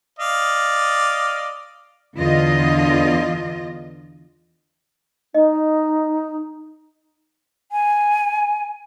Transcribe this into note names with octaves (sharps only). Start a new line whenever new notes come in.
D5 D#5 F5
E2 D3 F4 D#5
D#4 D#5
G#5